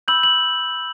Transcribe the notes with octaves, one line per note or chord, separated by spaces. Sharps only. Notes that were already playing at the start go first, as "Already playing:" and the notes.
B5 E6 G6 F#7
F#7